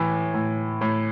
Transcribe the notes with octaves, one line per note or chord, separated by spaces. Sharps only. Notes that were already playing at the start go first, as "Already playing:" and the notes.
Already playing: A2 E3
A2
A2